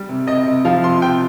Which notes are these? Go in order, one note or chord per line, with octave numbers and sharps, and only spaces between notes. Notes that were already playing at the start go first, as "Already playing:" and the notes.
Already playing: G3
C3
C3 D#5
C3
F3 F5
C3 C6
C3 G5